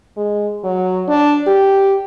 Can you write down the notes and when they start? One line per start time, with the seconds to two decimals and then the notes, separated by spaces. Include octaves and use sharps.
0.17 G#3
0.64 F#3
1.08 D4
1.47 G4